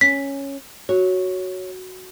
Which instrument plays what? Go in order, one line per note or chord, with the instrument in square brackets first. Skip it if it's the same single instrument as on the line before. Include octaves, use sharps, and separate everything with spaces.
[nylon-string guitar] C#4 [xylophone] B6
[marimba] F#4 [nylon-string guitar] C#5